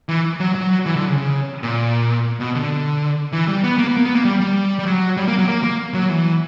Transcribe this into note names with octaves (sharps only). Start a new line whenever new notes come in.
E3
F#3
F#3
E3
D3
C#3
C#3
A#2
B2
D3
E3
G3
B3
A#3
B3
A#3
B3
A#3
G3
G3
G3
F#3
G3
A#3
F#3
A#3
A#3
F#3
E3